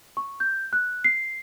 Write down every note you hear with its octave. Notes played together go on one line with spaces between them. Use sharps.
C#6
G6
F#6
C7